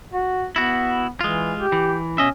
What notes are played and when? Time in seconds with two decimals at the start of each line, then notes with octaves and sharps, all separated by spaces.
0.13 F#4
0.56 B3 E4 F#4
1.21 E3 G#3 F4
1.58 G4
1.72 E3
2.18 B2 C#4 D#5 E5